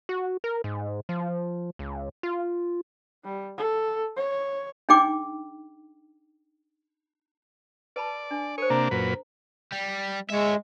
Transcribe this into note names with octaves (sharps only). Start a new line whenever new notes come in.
F#4
A#4
G#2
F3
C#2
F4
G3
A4
C#5
D4 D#4 G#4 G5 D6
B4 D5 A5 B5
D4
A#4 C5 C#5
C3 A#3 D4 A#5
F#2 A#2 B4
G3
G#3 C#5 E5